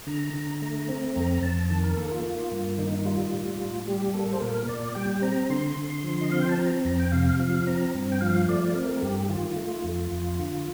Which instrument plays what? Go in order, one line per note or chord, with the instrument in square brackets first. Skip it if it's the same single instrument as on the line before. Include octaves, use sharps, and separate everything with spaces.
[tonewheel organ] D3 A#5
D3
A3
C4
F2 A#5
F2 A5
D#3 A5
A#4
A#3 A4
F4
A#3
G2
D#3 D#4
D#4
G3 F4
A2
A2
G3 G4
A#3 A4
C5
A#2 A#4
A#2 D5
G3 G5
C4 A#5
D3 C6
D3
F3
D#5
C4 F5
G5
A5
C4 A#5
F2 A#5
G5
C3 F5
F3 F5
C4 A#5
G2
G5
F3 F5
A3 D5
C4 A#4
G2 G4
D#3 F4
A3
F2
F2
D3